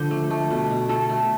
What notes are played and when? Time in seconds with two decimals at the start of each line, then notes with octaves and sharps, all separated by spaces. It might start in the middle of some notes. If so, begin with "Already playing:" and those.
Already playing: D3 F3 C5 D5
0.11 A3
0.30 A3
0.50 B2
0.70 B2
0.89 A3 A4
1.09 A3